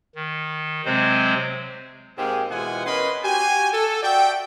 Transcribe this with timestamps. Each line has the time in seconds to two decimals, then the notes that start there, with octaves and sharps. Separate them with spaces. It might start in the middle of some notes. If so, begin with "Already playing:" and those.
0.16 D#3
0.85 C3 F#3 G#3 C4 C5
2.17 G#2 A#3 C4 G4 G#4
2.50 B2 E3 G#3 F4 F#5 G#5
2.86 C#4 A#4 B4 D#5 B5 C6
3.24 F#4 G4 G#5
3.72 A4
4.03 F#4 D5 E5 G5